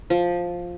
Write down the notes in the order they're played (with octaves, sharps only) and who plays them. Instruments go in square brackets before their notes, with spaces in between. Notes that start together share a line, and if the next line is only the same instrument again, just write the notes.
[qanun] F3